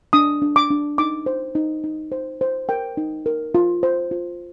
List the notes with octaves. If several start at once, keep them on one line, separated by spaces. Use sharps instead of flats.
D4 D#6
D4
D6
D4
D#4 D6
C5
D#4
D#4
C5
C5
A#4 G5
D#4
A#4
F4
C5
F4